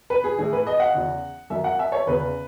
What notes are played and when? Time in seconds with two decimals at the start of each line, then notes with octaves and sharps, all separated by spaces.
0.10 B4
0.24 G#4
0.39 A2 E3 G#4
0.53 B4
0.67 D#5
0.80 F#5
0.94 E2 C#3 E3
1.50 F#2 E3 E5
1.64 F#5
1.79 E5
1.92 C#5
2.07 E2 C#3 E3 B4